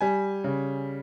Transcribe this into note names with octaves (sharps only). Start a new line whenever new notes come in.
G3 G#5
C#3